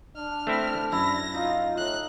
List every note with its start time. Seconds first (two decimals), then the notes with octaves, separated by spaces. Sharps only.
0.16 D4 F6
0.47 A3 C4 E4
0.92 F#2 E4 A#6
1.34 D#4 F4
1.78 A2 F#6